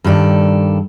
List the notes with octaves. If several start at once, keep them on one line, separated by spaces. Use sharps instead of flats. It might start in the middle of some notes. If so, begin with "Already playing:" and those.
G2 D#3 A4 D5